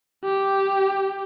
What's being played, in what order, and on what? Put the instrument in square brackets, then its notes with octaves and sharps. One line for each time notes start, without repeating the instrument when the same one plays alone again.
[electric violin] G4